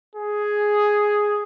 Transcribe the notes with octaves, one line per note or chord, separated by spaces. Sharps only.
G#4